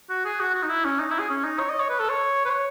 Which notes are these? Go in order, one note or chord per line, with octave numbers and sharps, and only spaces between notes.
F#4
G#4
F#4
F#4
D#4
E4
C#4
D#4
E4
G#4
C#4
D#4
C#5
D#5
C#5
B4
A4
C#5
B4
C#5